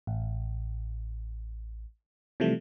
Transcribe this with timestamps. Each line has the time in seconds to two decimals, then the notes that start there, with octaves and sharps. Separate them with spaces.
0.07 A1
2.40 C3 E3 F3 G3 A3